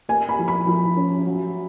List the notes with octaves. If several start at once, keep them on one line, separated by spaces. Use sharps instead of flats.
A#3 G#5
B5
F3
B5
F3
C#4
F#3